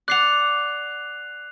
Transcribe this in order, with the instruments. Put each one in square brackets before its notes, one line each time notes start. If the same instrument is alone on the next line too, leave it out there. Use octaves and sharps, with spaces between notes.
[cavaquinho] D5 F#5 [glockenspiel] F#6 C7 F7